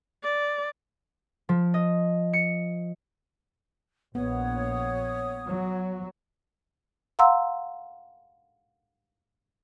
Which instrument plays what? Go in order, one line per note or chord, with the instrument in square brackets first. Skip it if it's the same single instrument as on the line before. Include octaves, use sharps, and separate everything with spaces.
[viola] D5
[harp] F3
D#5
C#7
[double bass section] A#1 [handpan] B3 [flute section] C#5 D#6
[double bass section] F#3
[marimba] F5 F#5 A#5 C6 E6